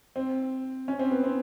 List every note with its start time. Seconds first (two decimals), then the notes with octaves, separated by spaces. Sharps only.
0.16 C4
0.88 C#4
0.99 C4
1.11 B3
1.24 C4